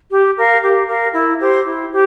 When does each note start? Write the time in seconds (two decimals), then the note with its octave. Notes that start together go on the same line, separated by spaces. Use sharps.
0.10 G4
0.36 A#4 F5
0.62 G4
0.87 A#4 F5
1.13 E4
1.39 G4 C5
1.64 E4
1.90 G4